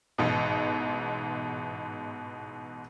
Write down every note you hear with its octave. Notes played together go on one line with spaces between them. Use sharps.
A1 G#2 B2